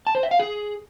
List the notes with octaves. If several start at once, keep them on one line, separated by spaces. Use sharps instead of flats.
A5
C5
E5
F5
G#4